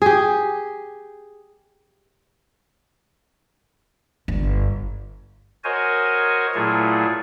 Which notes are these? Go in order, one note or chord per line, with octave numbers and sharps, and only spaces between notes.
G4 G#4
G1
F#4 A#4 C5 C#5 D#5 G#5
A#2 F#3 A3 E4 F4 G#4